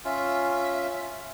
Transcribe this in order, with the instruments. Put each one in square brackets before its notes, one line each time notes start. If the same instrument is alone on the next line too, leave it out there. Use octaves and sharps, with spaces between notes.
[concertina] C#4 F4 [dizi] E5